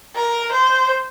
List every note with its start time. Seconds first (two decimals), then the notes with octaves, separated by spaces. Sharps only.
0.15 A#4
0.52 C5